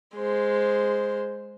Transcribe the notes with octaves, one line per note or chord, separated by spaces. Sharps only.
G#3 C5